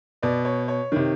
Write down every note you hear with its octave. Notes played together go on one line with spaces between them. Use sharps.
B2 D5
C#5
C#5
C3 D#3